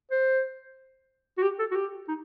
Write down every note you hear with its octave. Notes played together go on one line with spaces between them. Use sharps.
C5
F#4
G4
A4
F#4
G4
D#4